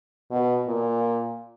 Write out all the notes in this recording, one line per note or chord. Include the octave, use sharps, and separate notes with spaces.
B2
A#2